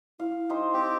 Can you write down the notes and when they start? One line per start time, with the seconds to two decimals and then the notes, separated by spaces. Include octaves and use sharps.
0.19 E4 F5
0.49 D#4 G4 C5
0.74 C4 G4 C5